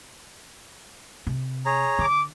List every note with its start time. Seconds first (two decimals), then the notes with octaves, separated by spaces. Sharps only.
1.27 C3
1.66 G#4 C#5 A#5
1.99 D3 D6